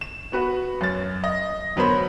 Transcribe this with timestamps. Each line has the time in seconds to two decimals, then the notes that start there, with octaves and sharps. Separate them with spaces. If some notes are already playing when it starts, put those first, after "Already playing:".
0.01 E7
0.32 B3 F#4 B4
0.81 F#2 A6
1.24 D#5
1.76 D2 F#3 B3 A#4 C5 B5